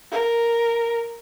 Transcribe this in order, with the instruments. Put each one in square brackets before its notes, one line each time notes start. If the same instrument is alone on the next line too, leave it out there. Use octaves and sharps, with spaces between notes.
[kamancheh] A#4